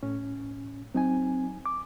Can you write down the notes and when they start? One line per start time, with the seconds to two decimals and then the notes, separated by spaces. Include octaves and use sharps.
0.03 A2 C#4
0.95 F#3 C4 D#4 G#5
1.66 D6